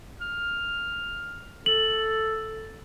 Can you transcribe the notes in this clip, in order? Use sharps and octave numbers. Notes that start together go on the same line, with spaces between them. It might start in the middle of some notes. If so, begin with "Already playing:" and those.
F6
A4 F#7